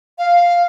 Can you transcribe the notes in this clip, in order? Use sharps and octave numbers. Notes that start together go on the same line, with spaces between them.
F5